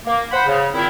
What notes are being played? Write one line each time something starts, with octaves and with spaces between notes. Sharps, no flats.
A#3
C5 F#5 B5
C#3
A#2 D#3 C4 E4